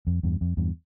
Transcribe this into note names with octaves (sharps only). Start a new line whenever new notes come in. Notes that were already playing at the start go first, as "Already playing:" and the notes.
F2
E2 G2
F2
E2 G2